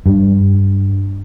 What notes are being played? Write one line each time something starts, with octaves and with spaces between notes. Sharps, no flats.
G2